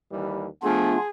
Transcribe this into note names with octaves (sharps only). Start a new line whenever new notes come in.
D#2 E3 G3
F3 A3 B3 D4 F4 G#4